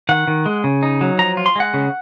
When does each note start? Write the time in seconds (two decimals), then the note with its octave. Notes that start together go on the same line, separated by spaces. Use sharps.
0.09 D#3 F#5
0.28 D#3
0.46 G#3
0.64 C#3
0.83 D#4
1.01 F#3
1.18 F3 A#5
1.37 F4
1.46 C6
1.56 G#3 F#5
1.74 C#3